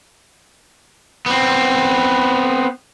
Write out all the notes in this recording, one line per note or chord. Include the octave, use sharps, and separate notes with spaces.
B3 C4